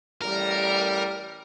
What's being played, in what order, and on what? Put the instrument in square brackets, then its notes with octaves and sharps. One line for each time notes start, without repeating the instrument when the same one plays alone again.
[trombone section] A1 G3 [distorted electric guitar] A#4